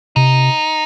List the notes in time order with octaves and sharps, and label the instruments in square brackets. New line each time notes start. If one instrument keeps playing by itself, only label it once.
[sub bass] C3 [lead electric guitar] D#4